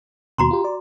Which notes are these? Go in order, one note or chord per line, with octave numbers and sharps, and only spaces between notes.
D#2 B2 F#4 A#5 C6
F4 G4
D5